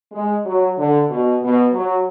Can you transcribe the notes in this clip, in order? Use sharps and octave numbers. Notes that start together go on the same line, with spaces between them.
G#3
F#3
D3
B2
B2
F#3